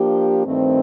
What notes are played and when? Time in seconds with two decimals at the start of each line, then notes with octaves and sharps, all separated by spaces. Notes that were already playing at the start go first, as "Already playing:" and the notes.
Already playing: F3 A#3 D4 G4
0.45 G2 D#3 A3 C4